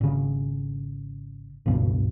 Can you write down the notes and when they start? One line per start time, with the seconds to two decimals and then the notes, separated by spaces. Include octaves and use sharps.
0.01 G#1 C#3
1.66 G#1 C#2 G2 B2